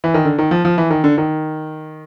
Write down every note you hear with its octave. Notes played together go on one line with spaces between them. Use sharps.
E3
D#3
D3
D#3
F3
F3
E3
D#3
D3
D#3